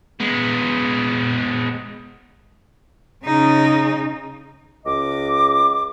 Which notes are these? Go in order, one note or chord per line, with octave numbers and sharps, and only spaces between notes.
G#3 B3
C#3 D#4
C#2 D#5 D6